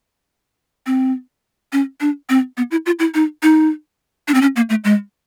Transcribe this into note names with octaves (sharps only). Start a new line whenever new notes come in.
C4
C#4
D4
C4
B3
E4
F4
E4
D#4
D#4
D4
C4
C#4
A#3
A3
G#3